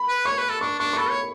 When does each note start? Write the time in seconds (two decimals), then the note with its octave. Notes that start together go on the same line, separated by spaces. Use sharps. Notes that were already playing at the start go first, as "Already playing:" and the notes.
Already playing: B5
0.08 B4
0.25 C#5 C#6
0.38 B4
0.50 A4
0.61 D4 C#6
0.79 D4 C#6
0.93 C#6
0.97 A4 B5
1.10 C#5